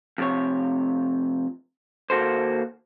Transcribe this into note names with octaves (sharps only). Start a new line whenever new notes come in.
F2 C3 C#5
D#2 A#3 F#4 A4 C5